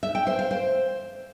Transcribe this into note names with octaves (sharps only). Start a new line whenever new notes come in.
E5
G5
C5
F5
C5